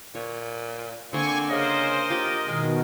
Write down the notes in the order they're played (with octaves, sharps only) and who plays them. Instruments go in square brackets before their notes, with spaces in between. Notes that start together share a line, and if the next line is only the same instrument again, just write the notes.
[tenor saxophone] A#2 [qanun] C#5
[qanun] D3 A#3 [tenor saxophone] C4 [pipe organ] G#5 C#6
[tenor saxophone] C#3 [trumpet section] A#4 D#5 [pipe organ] C5
[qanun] F4 [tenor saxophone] G4
[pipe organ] B2 D#3 [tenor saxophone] G#3